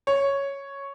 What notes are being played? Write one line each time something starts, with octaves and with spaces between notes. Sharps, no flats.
C#5